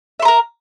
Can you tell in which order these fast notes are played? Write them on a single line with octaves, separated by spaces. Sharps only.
E5 C6 A#5 A#4